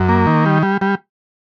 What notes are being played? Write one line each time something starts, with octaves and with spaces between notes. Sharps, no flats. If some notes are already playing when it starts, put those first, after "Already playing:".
Already playing: F#2
A#3
D#3
G3
G3
G3